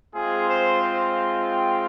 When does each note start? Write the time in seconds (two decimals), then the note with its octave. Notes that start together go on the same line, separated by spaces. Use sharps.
0.14 G#3 C4 F4 G#4
0.48 C5
1.50 G5